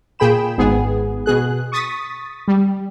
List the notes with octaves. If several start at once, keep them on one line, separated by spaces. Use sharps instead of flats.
A#2 G#4 G5 B5 E7
G#1 G#2 B3 G#4
B2 G#4 F#6
C#6 D#6 A6 B6
G3